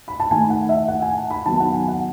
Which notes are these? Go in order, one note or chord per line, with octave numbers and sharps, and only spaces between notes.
B5
A5
D#3 A3 G#5
F#5
E5
F#5
G#5
A5
B5
D#3 F#3 B3 A5
F#5
G#5
F#5